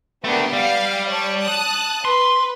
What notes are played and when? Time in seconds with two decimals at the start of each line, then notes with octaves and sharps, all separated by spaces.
0.24 A3 B3 D4 G4 A#4
0.53 G3 F5
1.08 C#5 A5
1.41 A5 D#6 F#6
2.05 B4 C6